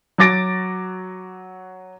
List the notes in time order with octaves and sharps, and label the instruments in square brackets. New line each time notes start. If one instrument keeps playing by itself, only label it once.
[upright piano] F#3 F#4 D6 A6 A#6 D7